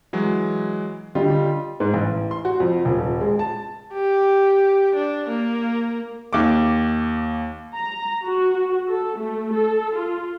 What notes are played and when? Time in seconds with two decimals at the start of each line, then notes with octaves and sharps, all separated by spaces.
0.13 E3 F#3 G#3
1.15 D3 G3 F4 D#5
1.80 G#2
1.94 A1
2.31 C6
2.45 F#4
2.60 F2
2.85 D#1
3.21 G#3
3.39 A5
3.93 G4
4.95 D4
5.28 A#3
6.33 D#2 D6
7.76 A#5
8.25 F#4
8.87 A4
9.18 A3
9.53 A4
9.98 F4